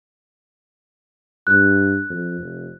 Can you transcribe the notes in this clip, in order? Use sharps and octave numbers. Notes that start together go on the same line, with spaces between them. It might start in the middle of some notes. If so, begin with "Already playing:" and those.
G2 F#6
F2
F1